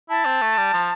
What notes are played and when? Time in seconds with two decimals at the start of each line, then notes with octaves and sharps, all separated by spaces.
0.10 E4 A5
0.25 C4
0.42 A3
0.58 G3
0.74 F3